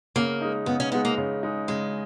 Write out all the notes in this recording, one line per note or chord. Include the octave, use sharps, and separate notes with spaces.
C#3 A#3
G#3 D#4
C#3 B3
C#4
G#3 B3 D#4
A#3
C#3
G#3 D#4
C#3 G#3